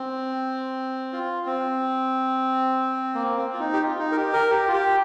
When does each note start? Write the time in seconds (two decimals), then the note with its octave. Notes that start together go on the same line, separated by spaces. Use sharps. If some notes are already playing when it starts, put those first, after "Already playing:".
Already playing: C4
1.13 F4
1.46 C4
3.15 A#3
3.37 C4
3.54 F4
3.60 D#4
3.73 G4
3.82 F4
3.99 D#4
4.12 A#4
4.16 G4
4.33 A#4
4.50 G4
4.68 F4
4.73 G4